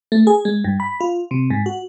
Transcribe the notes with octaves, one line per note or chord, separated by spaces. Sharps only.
A3
G#4
G#3
G2
B5
F4
C3
G#2
F#4